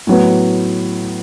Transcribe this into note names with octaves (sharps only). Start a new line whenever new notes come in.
A2 F#3 B3